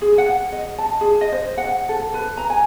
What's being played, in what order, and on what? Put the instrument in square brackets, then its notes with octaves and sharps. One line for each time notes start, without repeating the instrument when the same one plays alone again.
[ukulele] G#4
F#5
D#5
A5
G#4
D#5
C5
F#5
A4
B4
A#5
G#5